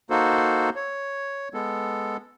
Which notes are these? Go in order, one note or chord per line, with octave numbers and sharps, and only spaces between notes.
A#3 D#4 F#4 A4 C5
C#5
G#3 B3 A4